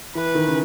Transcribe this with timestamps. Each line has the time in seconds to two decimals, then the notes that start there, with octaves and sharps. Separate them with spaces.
0.15 E3 B4
0.35 D#3
0.48 C#3